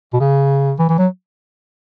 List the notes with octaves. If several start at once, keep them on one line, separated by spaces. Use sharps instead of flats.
B2
C#3
E3
E3
F#3